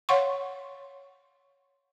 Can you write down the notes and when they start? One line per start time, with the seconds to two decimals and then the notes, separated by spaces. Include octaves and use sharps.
0.09 C#5 F5 F#5 C6 C#6